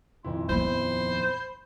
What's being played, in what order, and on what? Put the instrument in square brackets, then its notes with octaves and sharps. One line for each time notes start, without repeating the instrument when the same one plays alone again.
[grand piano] D#1 F2 E4 [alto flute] C6
[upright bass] F3 B3 [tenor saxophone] C5 [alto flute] B5